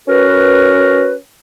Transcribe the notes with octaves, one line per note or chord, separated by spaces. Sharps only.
C#4 F#4 A#4 B4